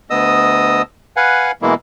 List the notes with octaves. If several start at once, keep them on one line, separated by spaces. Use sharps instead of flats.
D2 B3 D#5 D#6 E6
B4 F5 F#5 G#5
B2 E3 G#3 A#3 E4